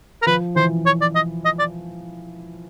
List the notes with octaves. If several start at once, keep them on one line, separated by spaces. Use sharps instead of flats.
A#4
F3 B4
E3 C5
C#5
D5
D#5
D#5
D5